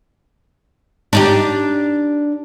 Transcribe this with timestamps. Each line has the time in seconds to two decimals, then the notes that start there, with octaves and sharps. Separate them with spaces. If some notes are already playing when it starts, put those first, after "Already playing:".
1.13 D4 D#4 G4